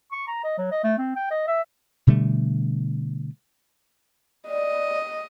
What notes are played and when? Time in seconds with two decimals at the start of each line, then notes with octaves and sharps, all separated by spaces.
0.12 C#6
0.28 A#5
0.44 D#5
0.58 F#3
0.72 D#5
0.84 A3
0.98 C4
1.16 G5
1.31 D#5
1.48 E5
2.07 B2 D3 G3 A3
4.48 D5 D#5